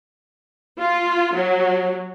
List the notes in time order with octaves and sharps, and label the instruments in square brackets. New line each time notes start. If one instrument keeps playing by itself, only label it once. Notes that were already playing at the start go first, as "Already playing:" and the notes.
[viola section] F4
F#3